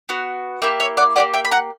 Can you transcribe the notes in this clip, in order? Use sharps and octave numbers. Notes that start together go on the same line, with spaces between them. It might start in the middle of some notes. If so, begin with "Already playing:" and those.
B3 F#4
A#3 E4 G4 E5 G5
C#5 E5
D5 F#5
A#3 C#4 G4 D5 F#5
E5 G5
B5
F#5 A#5